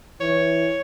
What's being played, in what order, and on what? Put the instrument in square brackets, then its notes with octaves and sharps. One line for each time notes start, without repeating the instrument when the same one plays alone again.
[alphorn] E3 [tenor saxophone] C#5